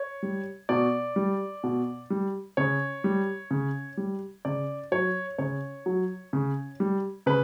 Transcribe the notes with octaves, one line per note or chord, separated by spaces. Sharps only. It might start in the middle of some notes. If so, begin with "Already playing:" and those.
Already playing: C#5
G3
B2 D5
G3
B2
G3
C#3 C#5
G3
C#3
G3
C#3 D5
F#3 C#5
C#3 C#5
F#3
C#3
G3
C#3 B4